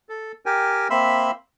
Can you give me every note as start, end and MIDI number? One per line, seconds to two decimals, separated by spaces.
0.09 0.32 69
0.46 0.88 67
0.46 0.88 70
0.46 0.88 79
0.46 0.88 80
0.90 1.31 58
0.90 1.31 60
0.90 1.31 76
0.90 1.31 83
0.90 1.31 84
0.90 1.31 88